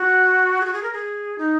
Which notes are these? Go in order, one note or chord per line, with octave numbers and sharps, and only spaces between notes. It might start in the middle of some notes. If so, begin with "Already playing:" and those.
Already playing: F#4
G#4
F#4
G#4
A#4
G#4
D#4